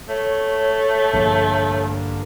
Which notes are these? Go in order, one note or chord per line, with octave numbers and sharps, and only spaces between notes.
A3 C#5
A#1 G2 D3 A#3